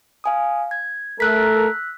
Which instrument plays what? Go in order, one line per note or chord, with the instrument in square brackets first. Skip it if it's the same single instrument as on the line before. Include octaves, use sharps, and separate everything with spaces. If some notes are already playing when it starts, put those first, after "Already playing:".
[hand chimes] F5 G#5 D#6
G#6
[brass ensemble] A3 A4 A#4 [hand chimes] E6 F#6 B6